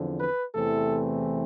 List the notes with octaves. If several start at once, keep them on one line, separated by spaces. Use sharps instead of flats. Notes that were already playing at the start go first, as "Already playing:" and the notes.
Already playing: E2 D3 F3 C4
B4
E2 C3 E3 A3 C4 A4